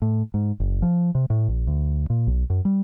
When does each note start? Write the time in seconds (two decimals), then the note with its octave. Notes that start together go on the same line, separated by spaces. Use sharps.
0.02 A2
0.34 G#2
0.60 F#1
0.82 F3
1.15 C3
1.30 A2
1.48 A#1
1.67 D2
2.10 A#2
2.27 B1
2.50 F#2
2.65 G3